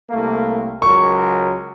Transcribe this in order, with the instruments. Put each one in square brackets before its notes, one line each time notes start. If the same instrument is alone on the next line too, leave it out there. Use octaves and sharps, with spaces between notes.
[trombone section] C2 A3 A#3
[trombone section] C#2 F#3 A#4 [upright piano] C#6